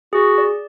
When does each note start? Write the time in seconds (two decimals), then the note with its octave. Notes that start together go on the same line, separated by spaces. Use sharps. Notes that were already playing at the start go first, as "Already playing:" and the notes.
0.13 F#4 G#4
0.38 D5